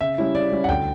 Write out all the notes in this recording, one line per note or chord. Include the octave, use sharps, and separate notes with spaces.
C#3 E5
G3 C#4 E4
C#3 D5
G3 C#4 E4
F#5
D2 G5